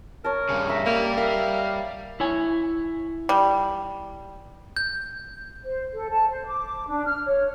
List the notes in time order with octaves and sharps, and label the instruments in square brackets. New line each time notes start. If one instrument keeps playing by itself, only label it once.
[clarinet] A#4 [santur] C#5 A5
[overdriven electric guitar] G2 C#3
[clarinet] E5 [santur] A#5
[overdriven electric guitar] G3 [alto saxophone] A#3
[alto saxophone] A#4 [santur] E5 [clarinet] F5
[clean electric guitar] E4 C#5 G#5
[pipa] G3
[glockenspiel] G6
[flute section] C5
A4
A5
C5
D6
D4
F6
C#5